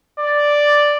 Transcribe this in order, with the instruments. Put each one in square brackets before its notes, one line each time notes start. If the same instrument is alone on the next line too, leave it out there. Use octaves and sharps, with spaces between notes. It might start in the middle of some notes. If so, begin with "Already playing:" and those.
[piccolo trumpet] D5